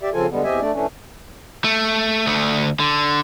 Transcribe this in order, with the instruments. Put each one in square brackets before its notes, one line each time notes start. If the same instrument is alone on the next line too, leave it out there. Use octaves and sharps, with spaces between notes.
[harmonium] G4 D5 E5
C#3 F3 C4 F4 A4 G#5
D3 G3 G#3 B3
E2 C4 G4 D#5 E5 G#5
A3 D4 D5
E3 A3 C#4 D4
[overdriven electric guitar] A3
D2 A3
D3